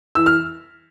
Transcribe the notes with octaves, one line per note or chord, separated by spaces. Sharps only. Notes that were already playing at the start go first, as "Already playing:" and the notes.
E3 E6
F6